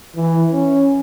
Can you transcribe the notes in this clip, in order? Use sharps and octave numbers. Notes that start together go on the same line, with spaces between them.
E3
C#4